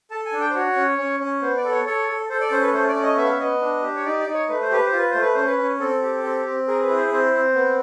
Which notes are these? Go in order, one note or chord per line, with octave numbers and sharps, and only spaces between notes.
A4 A5
G#5
D4
G5
C5
F#4 C#5
C#4
C#4
C#4
B3 C5
D5
A4
C#5
A4 C#5
A4
A4 C5
D5
C#4 C5
B4
A3 C5
D5
C#4
D#5
B3 E5
F5
E5
B3 D#5
D4
G4
C#5
D#4 D5
D5
D#4
C#5
A3 B4
C5
G4 B4
C5
F4
B4
A3 C5
B4
C#4 C5
B4
C#4
C4 A4
G4
C4
C4
G#4 A#4
B4
E4
C5
C4 C5
C4
B3